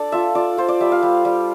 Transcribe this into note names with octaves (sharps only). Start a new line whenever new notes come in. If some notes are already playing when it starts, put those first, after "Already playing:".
Already playing: D4 A4 D5
F4 E5
F4 D5
F4 C5
D5
G3 E5
F5
G3
G3